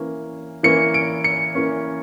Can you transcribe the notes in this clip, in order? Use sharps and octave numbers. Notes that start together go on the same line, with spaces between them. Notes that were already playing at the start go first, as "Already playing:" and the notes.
Already playing: E3 A#3 C#4
E3 A#3 C#4 C#7
D7
C#7
E3 A#3 C#4